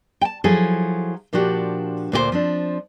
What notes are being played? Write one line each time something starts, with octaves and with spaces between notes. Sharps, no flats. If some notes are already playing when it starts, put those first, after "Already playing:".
G5 A5
F3 F#3 E4 G#4 A4
A#2 F3 D4 F#4 G4
D2 A#2 G4 C5
F3 C4 D4